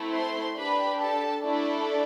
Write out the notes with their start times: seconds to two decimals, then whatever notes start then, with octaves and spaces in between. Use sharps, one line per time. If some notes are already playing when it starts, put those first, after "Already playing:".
Already playing: A3 C4 E4
0.14 C5 C6
0.57 D4 G4 B4 B5
1.00 A4 A5
1.42 A3 D4 E4 A4 D5